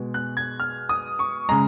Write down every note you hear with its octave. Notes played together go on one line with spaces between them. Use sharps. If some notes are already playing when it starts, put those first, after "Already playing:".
Already playing: B2 G#3
F#6
G#6
F6
D#6
C#6
C#3 G#3 A#5